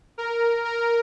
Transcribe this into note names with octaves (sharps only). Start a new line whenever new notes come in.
A#4
A#4